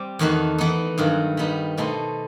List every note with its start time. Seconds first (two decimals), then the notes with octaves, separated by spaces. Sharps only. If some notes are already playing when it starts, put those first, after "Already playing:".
Already playing: G3 C4 C5
0.19 E2 D#3 A3 D#4 F#4
0.58 E3 B3 D#4
0.98 G2 D#3 F#3
1.37 G3 B3 D#4
1.77 B2 A3 D#4 A4 C5